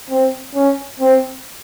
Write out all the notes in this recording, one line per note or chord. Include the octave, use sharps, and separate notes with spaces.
C4
C#4
C4